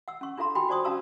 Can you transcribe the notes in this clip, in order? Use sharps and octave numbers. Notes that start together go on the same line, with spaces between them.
F#5 E6
C#4 C#6
D4 F4 A4 F5 A#5 C6
F4 F#4 G5 G#5 B5 C6
F#4 C5 D5 A5 C#6 D#6
C#4 F#4 F5 A5 A#5 E6